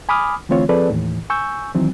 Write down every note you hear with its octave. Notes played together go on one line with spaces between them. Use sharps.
G#5 B5 D6 D#6 F6
D3 E3 A3 C4 F4 C#5
F3 C4 G#4 A4 B4 D5
D#2 A2 E3
G#5 C#6 E6 G6
D#3 E3 F#3 C4